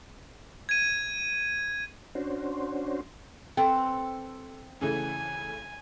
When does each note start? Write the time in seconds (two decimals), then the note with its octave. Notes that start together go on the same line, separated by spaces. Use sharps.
0.69 G#6 D#7
2.15 C#4 D4 F#4 C5
3.57 C4 A4 B4 G5
4.81 C#3 E3 A3 G#5